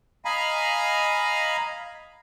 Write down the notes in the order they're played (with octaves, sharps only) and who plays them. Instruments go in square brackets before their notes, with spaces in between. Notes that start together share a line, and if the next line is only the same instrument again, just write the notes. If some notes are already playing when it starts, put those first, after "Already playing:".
[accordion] D#5 F5 G#5 A#5 B5